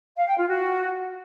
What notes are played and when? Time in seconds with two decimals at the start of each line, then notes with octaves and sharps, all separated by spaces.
0.16 F5
0.27 G5
0.38 F4
0.48 F#4